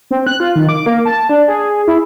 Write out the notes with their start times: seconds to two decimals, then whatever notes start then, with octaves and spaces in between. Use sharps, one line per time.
0.11 C4
0.27 F#6
0.40 F4
0.56 D#3
0.69 D6
0.86 A#3
1.05 A5
1.29 D4
1.48 G#4
1.88 E4